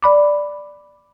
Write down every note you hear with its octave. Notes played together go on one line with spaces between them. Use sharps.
D5 B5 D6